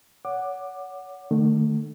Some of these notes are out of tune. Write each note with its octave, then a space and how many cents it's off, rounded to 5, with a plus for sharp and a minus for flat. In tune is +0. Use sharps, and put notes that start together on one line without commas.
C#5 +30 F#5 +0 D6 +20
D#3 -45 A3 +5